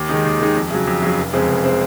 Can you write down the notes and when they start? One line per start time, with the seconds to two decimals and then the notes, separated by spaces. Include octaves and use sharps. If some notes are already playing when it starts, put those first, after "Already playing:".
Already playing: D#2
0.09 D#3 G#3 D#4
0.25 D#2
0.39 D#3 G#3 D#4
0.56 F2
0.70 C#3 F#3
0.87 F2
1.02 C#3 F#3
1.18 F1
1.33 F2 C#3 G#3 C4
1.48 F1
1.64 C#3 G#3 C4